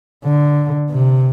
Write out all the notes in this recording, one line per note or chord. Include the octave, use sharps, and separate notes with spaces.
D3
C3